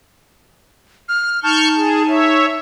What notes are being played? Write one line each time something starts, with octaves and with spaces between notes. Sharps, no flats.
F6
D#4 A5 C#6 F6 G6
G#4
C#5 E5